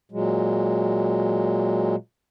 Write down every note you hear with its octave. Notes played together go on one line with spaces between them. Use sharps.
A#2 F#3 G#3